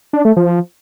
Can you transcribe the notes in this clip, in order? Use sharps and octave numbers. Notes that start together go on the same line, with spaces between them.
D4
A3
F3